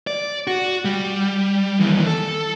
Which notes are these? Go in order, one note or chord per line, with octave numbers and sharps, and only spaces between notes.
D5
F#4
G3
D#2 E3
A4